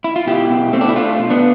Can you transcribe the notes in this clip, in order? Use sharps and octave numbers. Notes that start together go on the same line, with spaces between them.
E4
F4
B2 E4 G4
B2
A3 C4
D4
E4
A3 D4 F4
B2
B3 D4